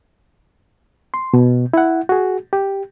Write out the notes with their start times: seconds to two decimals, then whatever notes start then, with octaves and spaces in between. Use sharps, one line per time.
1.14 C6
1.34 B2
1.74 E4 F#5
2.09 F#4 G#4
2.53 G4